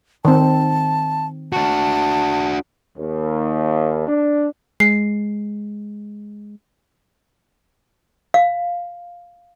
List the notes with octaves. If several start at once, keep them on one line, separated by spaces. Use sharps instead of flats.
D#3 C4 A5
D4 F#4 A5
D#2
D4
G#3 C7
F5